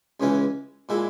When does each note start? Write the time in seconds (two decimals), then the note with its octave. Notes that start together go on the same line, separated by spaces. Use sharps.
0.20 C#2 C#3 E3 G#3 C#4
0.89 A#2 G#3 E4